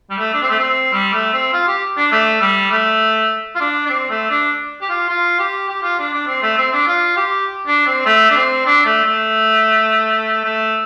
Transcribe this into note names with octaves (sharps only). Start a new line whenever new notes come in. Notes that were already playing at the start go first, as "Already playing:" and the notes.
G3
A3
D4
C4
A3
C4
G3
A3
C4
F4
G4
D4
A3
G3
A3
F4
D4
D4
C4
A3
D4
G4
F4
F4
G4
G4
F4
D4
D4
C4
A3
C4
D4
F4
G4
D4
C4
A3
D4
C4
D4
A3
A3
A3